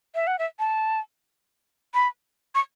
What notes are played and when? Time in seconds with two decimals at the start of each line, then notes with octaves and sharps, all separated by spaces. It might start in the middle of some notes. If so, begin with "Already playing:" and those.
0.15 E5
0.27 F#5
0.39 E5
0.59 A5
1.94 B5
2.55 C#6